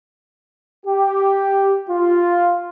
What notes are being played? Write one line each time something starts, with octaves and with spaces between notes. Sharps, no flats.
G4
F4